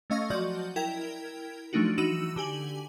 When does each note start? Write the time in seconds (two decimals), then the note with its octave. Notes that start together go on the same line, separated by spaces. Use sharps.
0.10 A3 C#4 D#5 F5 C#6 A#6
0.30 F3 F#3 F#4 D5 D#5 G6
0.76 E4 A#4 G5 G#6
1.73 F3 F#3 A3 D4 D#4 F#4
1.98 E3 D#4 F#4 E6 D#7 E7
2.36 D3 G4 G#5 F#7